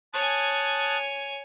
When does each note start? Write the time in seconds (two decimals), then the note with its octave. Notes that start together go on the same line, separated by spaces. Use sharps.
0.14 C#5 G#5 A5 D#6 F#6